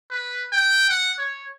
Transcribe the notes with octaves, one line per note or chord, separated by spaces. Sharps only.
B4
G5
F#5
C#5